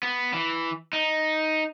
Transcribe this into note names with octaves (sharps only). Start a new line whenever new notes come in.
B3
E3
D#4